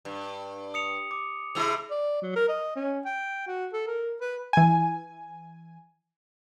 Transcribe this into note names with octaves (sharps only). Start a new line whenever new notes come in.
G2
D#6 C#7 F7
D6
C3 G#3 E4 E6 F7
D5
F#3
A#4
D#5
C#4
G5
F#4
A4
A#4
B4
E3 G#5